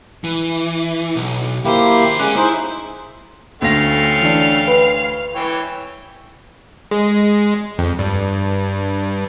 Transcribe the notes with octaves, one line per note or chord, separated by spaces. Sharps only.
E3
B1
D#2 A#3 E4 G4 C5
G#3 C#4 G#4 D6 F#6
D#4 E4 G#4 C5
D2 A3 C#4 F5 G5 A#6
E3 D4
B4
E3 C#5 G5
G#3
F2
G2